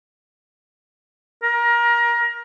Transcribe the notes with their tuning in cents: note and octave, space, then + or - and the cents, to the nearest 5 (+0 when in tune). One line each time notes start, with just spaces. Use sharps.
A#4 +25